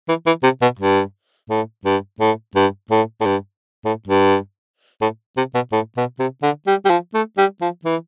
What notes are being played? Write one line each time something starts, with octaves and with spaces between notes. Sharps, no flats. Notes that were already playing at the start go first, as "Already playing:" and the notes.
E3
E3
C3
B2
G2
A2
G2
A2
G2
A2
A2
G2
A2
G2
A2
C3
B2
A2
B2
C3
D3
G3
G3
F3
A3
G3
F3
E3